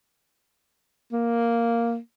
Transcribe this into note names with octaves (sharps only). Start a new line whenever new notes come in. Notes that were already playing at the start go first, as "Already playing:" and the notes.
A#3